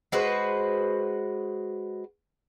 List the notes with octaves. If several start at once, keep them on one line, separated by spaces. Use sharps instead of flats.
G#3 F#4 B4 C5